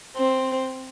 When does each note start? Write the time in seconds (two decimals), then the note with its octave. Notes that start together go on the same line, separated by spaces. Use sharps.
0.16 C4